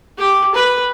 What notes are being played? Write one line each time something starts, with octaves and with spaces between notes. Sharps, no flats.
G4
B4